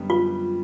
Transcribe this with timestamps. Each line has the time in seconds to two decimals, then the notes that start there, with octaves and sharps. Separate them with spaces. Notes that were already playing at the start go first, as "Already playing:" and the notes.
Already playing: F#2 D3 G3 B3
0.10 F4